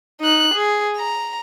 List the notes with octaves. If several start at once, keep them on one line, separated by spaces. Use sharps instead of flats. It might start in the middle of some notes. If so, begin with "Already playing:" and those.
D#4 F#6
G#4
A#5